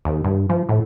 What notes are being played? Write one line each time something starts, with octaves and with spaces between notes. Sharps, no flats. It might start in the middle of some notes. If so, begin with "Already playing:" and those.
D#2
G2
F3
A2